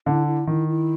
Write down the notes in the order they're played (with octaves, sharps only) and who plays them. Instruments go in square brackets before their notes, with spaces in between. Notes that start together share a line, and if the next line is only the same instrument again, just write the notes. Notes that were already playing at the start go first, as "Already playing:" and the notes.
[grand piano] D3 [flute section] E4
[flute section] E4
[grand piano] D#3 [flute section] E4
[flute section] E4